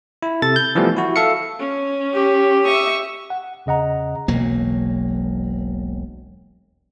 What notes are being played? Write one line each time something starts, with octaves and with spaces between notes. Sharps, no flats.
E4
C3 A4 A6
G6
E3 F3 G3 A3 B3
E4 F#4
A4 E5 F5 C#7
C#4
G4
E5 C#6 D#6
F#5
E2 C#3 D#5 F#5 A#5
E1 B1 F#3 A#3